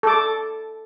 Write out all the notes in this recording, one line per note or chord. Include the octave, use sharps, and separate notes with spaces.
A4 D6